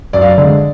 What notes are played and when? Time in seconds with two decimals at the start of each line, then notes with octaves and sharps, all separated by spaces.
0.13 F#2 D5
0.22 F5
0.30 D5
0.38 D3 G#3